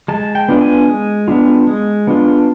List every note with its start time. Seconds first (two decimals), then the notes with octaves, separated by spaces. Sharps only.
0.08 G#3 A5
0.35 G5
0.48 B3 D4 F4
0.61 G#5
0.88 G#3
1.28 B3 D4 F4
1.67 G#3
2.07 B3 D4 F4